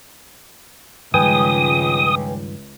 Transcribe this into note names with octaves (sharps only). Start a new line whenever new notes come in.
C#2 G2 D#3 F3 B4 G5 G#5 D#6